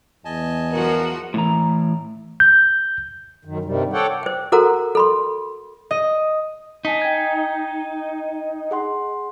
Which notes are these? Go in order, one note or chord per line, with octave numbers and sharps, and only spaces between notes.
E2 D#5 G#5 A5
F3 F#4 A#4
A2 E3 A#5
G6
F#2 D#3
G2 C3 D#3 G3
A4 C#5 D5 F#5 G5
C5 G5
F#4 A4 A#4 C5 F#5 A#5
A4 B5 C6
D#5
D#4 G#5 A5 B6
G5 G#6
G#4 F#5 C6